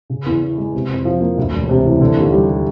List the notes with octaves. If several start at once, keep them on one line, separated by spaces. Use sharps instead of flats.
C#3
E2
E3
G#3
C3
F2
F3
A#3
D2
E1
C3
E3
D3
D#2
G3